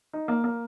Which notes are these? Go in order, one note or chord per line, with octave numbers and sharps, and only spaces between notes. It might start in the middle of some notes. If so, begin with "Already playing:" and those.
D#4
A#3
A#3